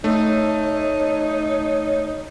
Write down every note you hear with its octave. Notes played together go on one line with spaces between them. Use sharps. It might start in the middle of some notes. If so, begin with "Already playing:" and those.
A3 D#4 C#5